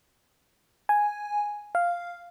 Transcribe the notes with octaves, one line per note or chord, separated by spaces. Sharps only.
G#5
F5